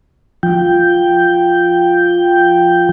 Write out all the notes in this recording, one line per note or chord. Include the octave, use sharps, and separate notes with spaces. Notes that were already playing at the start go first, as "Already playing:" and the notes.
F3 G5